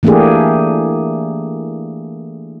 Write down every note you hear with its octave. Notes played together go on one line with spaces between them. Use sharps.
E3 A3 A#3 D4 G4 G#4